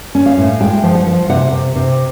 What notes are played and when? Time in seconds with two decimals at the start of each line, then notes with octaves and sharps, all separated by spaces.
0.15 C#4
0.26 F5
0.38 A2
0.61 G#3 G5
0.83 F3
0.95 F#5
1.07 F3
1.29 C3 F#5
1.52 C3
1.76 C3